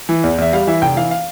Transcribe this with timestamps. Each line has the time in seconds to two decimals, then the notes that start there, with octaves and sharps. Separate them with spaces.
0.09 E3
0.24 E2
0.38 E2 E5
0.53 G3 F5
0.67 E3 E5
0.81 F1 G5
0.96 E3 F5
1.11 F5